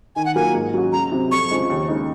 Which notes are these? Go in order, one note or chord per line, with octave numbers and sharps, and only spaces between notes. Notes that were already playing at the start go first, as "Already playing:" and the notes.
D#3 G#5
F#5
F#3 A#3 F4 A#4 G#5
G#2
F#3 C#4 F#4
C#2 A#5
C3 F#3
F2 C#6
C#3 F3 G#3
D#2
C#3 G#3 D#4